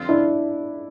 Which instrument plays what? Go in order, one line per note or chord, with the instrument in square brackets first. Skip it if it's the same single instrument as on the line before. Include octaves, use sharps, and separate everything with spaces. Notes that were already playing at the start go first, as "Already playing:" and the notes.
Already playing: [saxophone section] F2 D3 G3 C4 F4
[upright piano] D4 E4